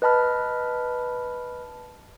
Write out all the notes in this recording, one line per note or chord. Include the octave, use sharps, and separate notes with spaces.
B4 D#5 A5 B5 F6